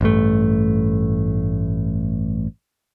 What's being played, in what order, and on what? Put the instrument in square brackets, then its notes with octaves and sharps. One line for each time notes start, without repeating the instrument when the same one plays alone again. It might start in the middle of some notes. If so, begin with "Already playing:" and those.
[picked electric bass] A1 G2 A3